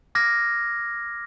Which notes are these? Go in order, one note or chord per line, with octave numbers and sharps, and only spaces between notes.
D6 F6 G#6 A#6